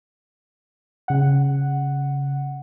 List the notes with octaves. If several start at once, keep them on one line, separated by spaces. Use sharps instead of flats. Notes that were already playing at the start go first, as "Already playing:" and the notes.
C#3 F#5